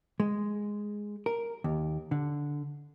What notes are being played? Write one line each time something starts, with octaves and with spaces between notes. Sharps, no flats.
G#3
A#4
D#2
D3